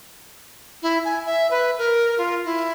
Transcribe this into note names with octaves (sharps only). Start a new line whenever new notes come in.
E4
G#5
E5
B4
A#4
F4
E4